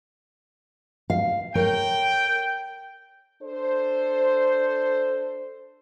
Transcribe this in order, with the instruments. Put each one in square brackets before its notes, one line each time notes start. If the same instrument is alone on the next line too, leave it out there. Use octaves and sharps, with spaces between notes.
[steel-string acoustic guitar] F5
[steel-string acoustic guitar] A#4 C#5 [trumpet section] G5
[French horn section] D4 A4 C5